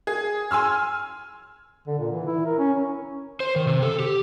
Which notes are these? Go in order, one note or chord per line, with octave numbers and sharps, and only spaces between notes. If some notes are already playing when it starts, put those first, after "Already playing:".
G#4
G#5 C6 E6 F6
D3
A#2
E3
E4
A#4
C#4
C5
D#3
C3
A4
G4